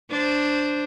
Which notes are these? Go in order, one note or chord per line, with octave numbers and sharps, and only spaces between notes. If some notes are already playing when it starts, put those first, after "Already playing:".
D4 C5